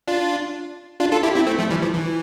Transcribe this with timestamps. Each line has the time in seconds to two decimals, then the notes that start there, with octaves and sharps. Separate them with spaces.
0.07 D4 F4
1.00 D4 F4
1.12 F4 A4
1.23 E4 G4
1.35 C4 E4
1.46 A3 C4
1.58 F3 A3
1.70 E3 G3
1.82 F3
1.94 E3